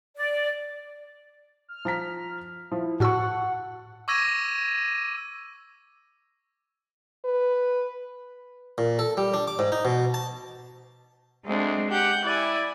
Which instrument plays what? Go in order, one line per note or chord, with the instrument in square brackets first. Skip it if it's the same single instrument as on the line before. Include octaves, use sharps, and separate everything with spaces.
[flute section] D5
[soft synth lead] F6
[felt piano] F3 A#5 B6
[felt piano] F3 [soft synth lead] E4
[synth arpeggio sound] A2 F#4 E6 [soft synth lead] F#5 [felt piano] A5 C#6
[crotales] C#6 D6 E6 G#6 A#6 D#7
[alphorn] B4
[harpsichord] A#2
A4
G3
D4
D6
G#2
D#4
B2
A5
[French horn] D2 [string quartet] G#3 C4 D4
[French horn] G4 [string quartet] F#5 G6
[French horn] E4 [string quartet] D5 G#5